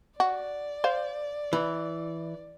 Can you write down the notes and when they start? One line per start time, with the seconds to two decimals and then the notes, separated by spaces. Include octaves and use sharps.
0.20 F#4 D5
0.84 C5 F5
1.53 E3